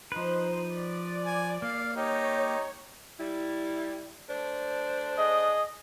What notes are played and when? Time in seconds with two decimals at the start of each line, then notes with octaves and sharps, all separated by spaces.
0.12 F3 D#4 B4 C5
0.73 D5
1.25 G#5
1.62 A#3 F5
1.96 D#4 G4 C#5
3.20 G3 E4
4.29 A3 D4 C5
5.17 G#4 D#5